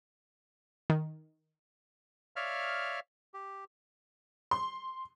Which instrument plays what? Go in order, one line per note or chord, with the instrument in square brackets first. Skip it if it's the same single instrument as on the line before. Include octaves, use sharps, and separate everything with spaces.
[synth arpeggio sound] D#3
[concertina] C#5 D5 E5 F5 F6
G4
[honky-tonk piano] C6